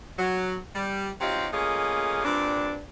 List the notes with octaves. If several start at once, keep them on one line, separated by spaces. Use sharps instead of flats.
F#3
G3
F#3 C4 D#4 F4 G4
A3 A#3 C#4 F4 G#4 D#5
G2 A#2 C4 D4